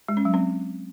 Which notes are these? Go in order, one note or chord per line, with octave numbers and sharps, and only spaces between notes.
G#3
C#4
F#3
C4